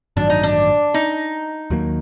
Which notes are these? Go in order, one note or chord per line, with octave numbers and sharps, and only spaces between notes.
A1 G2 D#3 F#3 D4
D#4
D4
D#4
D#2 D#3 F#3 A#3